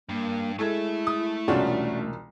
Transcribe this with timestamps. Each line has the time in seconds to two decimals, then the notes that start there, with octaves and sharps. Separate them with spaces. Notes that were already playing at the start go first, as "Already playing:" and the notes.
0.09 G2 A#3
0.59 G#3 A3 E4 A4 E5 G#6
1.07 D#6
1.48 E1 C2 C#4 D4 F4 F#4